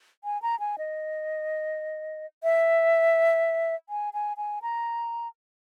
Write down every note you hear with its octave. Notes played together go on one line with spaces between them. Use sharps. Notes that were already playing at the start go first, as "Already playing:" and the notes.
G#5
A#5
G#5
D#5
E5
G#5
G#5
G#5
A#5